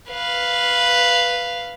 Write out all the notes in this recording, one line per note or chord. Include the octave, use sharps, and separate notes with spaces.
B4 F5